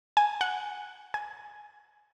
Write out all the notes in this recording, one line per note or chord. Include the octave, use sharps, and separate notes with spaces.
G#5
F#5
G#5